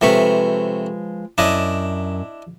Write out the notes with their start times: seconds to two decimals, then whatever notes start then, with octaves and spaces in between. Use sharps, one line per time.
0.01 C3 F3 G#3 A3 B4 C#6
1.38 F#2 D4 E4 D#5